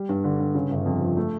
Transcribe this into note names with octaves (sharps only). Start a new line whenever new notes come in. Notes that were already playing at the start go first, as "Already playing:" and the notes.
Already playing: G3
G2
D3
G2
C#3
G1
F2
F3
A3